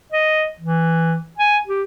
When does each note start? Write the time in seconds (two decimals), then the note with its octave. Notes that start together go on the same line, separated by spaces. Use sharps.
0.12 D#5
0.60 E3
1.38 G#5
1.67 G4